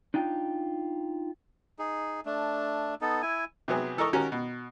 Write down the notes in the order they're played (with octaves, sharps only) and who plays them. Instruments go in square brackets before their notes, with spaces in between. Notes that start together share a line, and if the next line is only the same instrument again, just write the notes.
[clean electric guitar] D4 D#4 F4 G5
[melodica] D#4 G#4
A3 D4
B3 D#4 A4
E4 G#5
[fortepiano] C3 F#3 B3 G#4
E3 A4 A#4 D#5 C#6
D#3 C#4 F#4 G4 A#4
B2